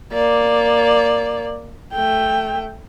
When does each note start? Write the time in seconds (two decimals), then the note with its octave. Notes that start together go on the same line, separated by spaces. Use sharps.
0.13 A#3 D5
1.93 A3 G5